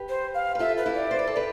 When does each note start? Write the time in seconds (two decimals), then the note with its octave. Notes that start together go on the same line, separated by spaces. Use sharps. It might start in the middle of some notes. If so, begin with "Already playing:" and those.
Already playing: G4 B4
0.09 C5
0.34 F5
0.55 B4
0.59 F4 A4 E5
0.77 B4
0.86 E4 G4
0.95 D5
1.11 C5
1.19 B4
1.27 A4
1.36 G4 B4